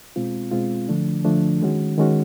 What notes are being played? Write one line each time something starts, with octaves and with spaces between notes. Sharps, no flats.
B2 G#3 C4 F4
B2 G#3 C4 F4
D3 F3 A3 D4
D3 F3 A3 D4
D#3 G#3 C#4 F#4
D#3 G#3 C#4 F#4